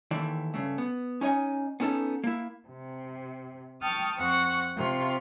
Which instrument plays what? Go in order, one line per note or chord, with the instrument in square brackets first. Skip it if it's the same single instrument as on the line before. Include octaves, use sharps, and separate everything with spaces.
[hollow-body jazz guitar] D#2 D#3 E3 A3 D5
G2 C#3 A3
B3
C#4 D#4 C#5 D#5 G#5
B3 C#4 D#4 A4
A#3 E4
[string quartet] C3
G5 A5 C#6 D#6 F6 A6
F2 C4 F#5 C#6
C3 F4 C#6